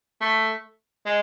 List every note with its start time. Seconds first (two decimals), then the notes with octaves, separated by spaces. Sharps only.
0.21 A3
1.06 G#3